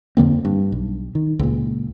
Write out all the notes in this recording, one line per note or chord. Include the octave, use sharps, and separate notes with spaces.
F2 D3 A#3 C4
G2
B1
D#3
C#2 A#2